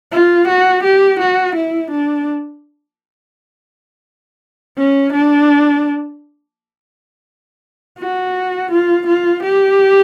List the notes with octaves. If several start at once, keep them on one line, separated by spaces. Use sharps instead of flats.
F4
F#4
G4
F#4
E4
D4
C#4
D4
F#4
F4
F4
G4